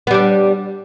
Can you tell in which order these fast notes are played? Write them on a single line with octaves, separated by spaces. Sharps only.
B3 G3 D4